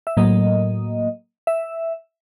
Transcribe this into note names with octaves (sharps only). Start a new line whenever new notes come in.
E5
A2 F#3 A#3 D#5
E5